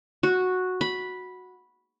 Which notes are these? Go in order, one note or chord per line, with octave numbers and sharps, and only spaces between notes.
F#4
B5